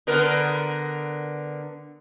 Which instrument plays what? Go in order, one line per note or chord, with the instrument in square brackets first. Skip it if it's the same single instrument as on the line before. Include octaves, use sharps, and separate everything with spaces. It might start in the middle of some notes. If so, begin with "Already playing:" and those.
[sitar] D3 B3 A#4